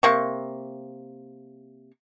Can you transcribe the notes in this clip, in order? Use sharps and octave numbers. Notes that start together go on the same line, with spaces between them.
C3 A#3 C#6